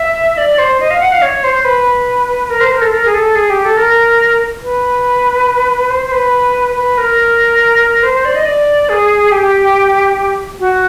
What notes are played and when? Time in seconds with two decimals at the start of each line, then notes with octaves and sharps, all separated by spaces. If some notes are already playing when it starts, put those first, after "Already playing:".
Already playing: E5
0.37 D5
0.58 C5
0.80 D#5
0.91 F5
1.00 F#5
1.12 F5
1.22 C#5
1.44 C5
1.64 B4
2.50 A#4
2.60 C5
2.72 A#4
2.81 A4
2.92 A#4
3.05 G#4
3.14 A4
3.35 G#4
3.50 G4
3.63 A4
3.77 A#4
4.63 B4
5.90 C5
6.06 C5
6.12 B4
6.76 B4
6.98 A#4
8.03 C5
8.14 C5
8.25 D5
8.35 D#5
8.45 D5
8.89 G#4
9.31 G4
10.59 F#4